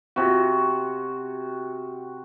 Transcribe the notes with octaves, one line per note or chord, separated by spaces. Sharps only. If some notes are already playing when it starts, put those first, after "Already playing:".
C3 F#4